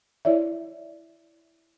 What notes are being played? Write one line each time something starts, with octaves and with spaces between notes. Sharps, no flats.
E4 C#5 D5 E5